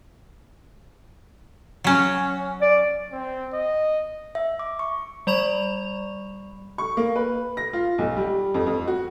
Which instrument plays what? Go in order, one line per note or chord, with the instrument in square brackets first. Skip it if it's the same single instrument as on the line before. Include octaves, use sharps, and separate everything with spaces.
[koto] F#3 C#4
[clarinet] D5
[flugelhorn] C4
D#5
[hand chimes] E5
D6
C#6
[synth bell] G3 D5 B5 C#6 F7
[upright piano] C#6
A#3
B4
A#6
F4
B1
G3
F2
F2
F#4